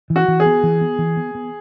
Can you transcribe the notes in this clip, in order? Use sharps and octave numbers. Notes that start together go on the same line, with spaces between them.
E3
F#4
E3
G#4
B3
E3
B3
E3
B3
B3